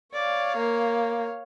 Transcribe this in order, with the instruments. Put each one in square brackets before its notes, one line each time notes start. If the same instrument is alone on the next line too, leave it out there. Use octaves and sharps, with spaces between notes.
[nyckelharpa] C#5 F5 [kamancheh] D5
[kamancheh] A#3